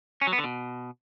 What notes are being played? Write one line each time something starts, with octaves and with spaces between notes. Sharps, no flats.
C#4
F#3
B3
D3
B2